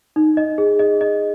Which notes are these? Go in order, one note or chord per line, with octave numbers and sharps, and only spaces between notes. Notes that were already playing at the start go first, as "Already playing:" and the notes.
D#4
D#5
G#4
D#5
D#5